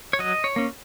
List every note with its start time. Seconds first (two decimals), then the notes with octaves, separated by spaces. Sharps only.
0.13 C#5
0.19 F#3 D#5
0.44 C#5
0.56 A#3 C#4